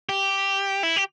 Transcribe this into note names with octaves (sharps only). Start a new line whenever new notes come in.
G4
E4
G4